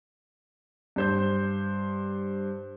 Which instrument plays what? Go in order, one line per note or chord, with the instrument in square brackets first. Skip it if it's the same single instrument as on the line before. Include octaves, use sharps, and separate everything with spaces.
[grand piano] G2 C5 G6